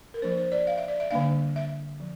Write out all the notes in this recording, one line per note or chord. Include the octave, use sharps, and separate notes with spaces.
A#4
F3 A#3 D4 C5
C5
D5
F5
E5
D5
E5
D3 G3 A#3 D4 F5
E5
F3